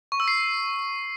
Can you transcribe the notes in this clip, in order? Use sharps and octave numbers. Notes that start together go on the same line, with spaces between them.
C#6
E6
C7